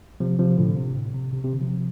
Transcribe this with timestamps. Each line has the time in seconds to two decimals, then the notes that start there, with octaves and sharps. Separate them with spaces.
0.20 C3 F3
0.39 C3 F3
0.58 A2 D3
0.77 C3
0.96 A2
1.14 C3
1.33 C3
1.44 C3
1.53 D3
1.61 C3 F3